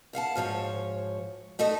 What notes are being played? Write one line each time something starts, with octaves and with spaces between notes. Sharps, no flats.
E2 F5 F#5 A5
D2 G#2 F3 C#5
A3 D#4 A4 D#5